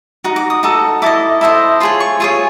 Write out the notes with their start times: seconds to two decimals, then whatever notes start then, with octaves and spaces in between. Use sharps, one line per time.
0.24 D#4 F#4
0.36 D6
0.50 D#6
0.63 D#4 F#4 A4
1.02 E4 A4 D#5 D6
1.41 E4 A4 C5 D#5
1.80 F4 G#4 C#5 C6
2.00 C#6
2.20 F4 G#4 C#5 C#6